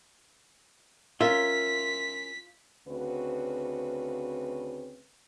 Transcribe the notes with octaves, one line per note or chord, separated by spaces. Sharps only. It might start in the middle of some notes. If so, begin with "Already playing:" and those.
C#4 F4 A#4 E5 B6
D2 C#3 C4 F#4 B4